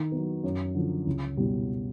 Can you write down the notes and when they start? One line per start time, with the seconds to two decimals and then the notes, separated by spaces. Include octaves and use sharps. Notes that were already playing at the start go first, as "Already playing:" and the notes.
Already playing: D#3
0.12 F#3 B3
0.44 F#2
0.75 D3 F3
1.07 C#2
1.37 B2 G3